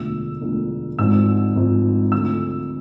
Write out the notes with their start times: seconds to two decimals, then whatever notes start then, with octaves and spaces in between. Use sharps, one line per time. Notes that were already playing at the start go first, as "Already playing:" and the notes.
Already playing: E1 D2 D3 F3 E6
0.41 E1 D2 D3 F3
0.99 G#1 G#2 F3 E6
1.56 G#1 G#2 F3
2.12 D2 D3 F3 E6